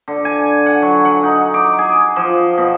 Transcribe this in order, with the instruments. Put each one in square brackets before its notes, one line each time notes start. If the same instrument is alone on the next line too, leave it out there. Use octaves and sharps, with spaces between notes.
[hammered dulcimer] D3
G#5
F#5
F#3
F#5
D#4
D6
G#4
F3
B2